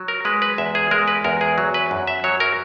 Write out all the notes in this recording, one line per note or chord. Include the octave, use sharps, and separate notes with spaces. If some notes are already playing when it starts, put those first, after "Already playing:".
Already playing: F#3
A#4
G#3 B4
B4
E2 E5
G#4
G#3 A#4
B4
E2 A#4
G#4
F#3
B4
F#2
E5
F#3 C#5
A#4